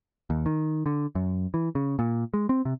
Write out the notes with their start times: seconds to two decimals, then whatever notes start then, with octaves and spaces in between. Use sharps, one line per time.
0.30 D#2
0.46 D#3
0.86 D3
1.15 F#2
1.54 E3
1.75 C#3
1.99 A#2
2.34 G#3
2.49 C4
2.65 C3